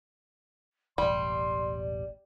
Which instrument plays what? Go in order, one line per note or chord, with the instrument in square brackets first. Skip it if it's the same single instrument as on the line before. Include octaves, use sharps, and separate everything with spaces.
[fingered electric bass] E1 A1 [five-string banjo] G3 [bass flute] D5 [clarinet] C6